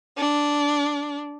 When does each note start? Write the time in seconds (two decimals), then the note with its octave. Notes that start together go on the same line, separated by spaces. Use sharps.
0.17 D4